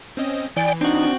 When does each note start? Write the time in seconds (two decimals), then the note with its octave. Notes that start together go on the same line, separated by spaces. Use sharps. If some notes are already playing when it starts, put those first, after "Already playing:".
0.17 C4 C#4 D#5
0.56 E3 D5 G5 G#5
0.81 C4 D4 D#4 F#4